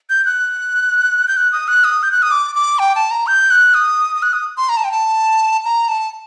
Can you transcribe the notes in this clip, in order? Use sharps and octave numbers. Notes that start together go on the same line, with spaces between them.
G6
F#6
G6
F#6
D#6
F#6
D#6
G6
F#6
D#6
D6
D6
G5
A5
A#5
G6
F#6
D#6
D#6
F#6
D#6
C6
A#5
A5
G5
A5
A#5
A5